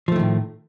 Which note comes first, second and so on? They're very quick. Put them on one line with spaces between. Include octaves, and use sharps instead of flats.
F3 A3 D#3 A2